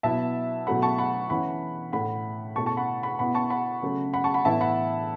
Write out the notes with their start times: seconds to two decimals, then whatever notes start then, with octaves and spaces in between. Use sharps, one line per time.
0.03 B2 F#3 B3 E4 E5 A5
0.67 B2 F#3 A3 E4 F#5 B5
0.82 A5 C#6
0.98 F#5 B5
1.30 E3 C#4 E4 F#5 B5
1.92 A2 A3 E4 F#5 B5
2.56 B2 A3 E4 A5 C#6
2.66 A5 C#6
2.77 F#5 B5
3.03 F#5 B5
3.19 B2 B3 E4 F#5 B5
3.35 A5 C#6
3.50 F#5 B5
3.82 C#3 F#3 A3
4.13 F#5 B5
4.24 A5 C#6
4.34 F#5 B5
4.45 A2 E3 B3 E4 E5 A5
4.61 F#5 B5